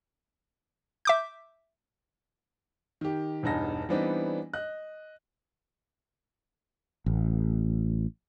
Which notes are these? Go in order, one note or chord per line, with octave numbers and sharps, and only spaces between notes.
E5 D6 G6
D#3 G4
E1 E2 G2 D#4 A#6
E3 G3 B3 C4 D4 D#4
D#5 F#6
A1